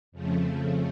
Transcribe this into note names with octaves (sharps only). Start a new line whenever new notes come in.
F2 C#3 F3 A3